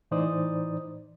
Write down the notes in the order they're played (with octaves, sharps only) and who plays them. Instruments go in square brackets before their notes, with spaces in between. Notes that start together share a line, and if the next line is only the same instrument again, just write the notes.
[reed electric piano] A2 E3 D#4 C5 D5 D#6